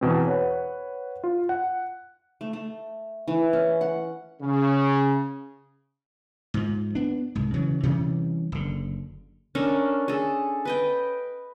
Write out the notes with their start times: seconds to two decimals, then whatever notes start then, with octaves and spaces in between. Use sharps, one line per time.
0.01 E2 B2 C4
0.26 B4 C#5 F#5
1.24 F4
1.49 F#5
2.41 A3
2.53 A3
3.28 E3
3.53 C#4
3.81 F#5
4.42 C#3
6.54 G#2 F3
6.95 B3 D4
7.35 C2 G#2
7.54 C#3 E3 F#3
7.83 C3 E3 G3 C#4
8.52 F#1 D3
9.55 C#4 D4 A4 A#4
10.08 G#4 A4
10.65 B4 D#5 G5